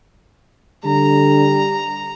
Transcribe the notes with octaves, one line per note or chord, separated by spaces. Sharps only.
D3 G3 A#5